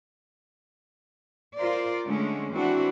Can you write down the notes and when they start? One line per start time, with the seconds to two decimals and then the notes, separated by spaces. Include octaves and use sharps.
1.56 F4 A#4 C5 D5
2.06 D3 G#3 A3 C#4
2.53 E3 C4 D4 F#4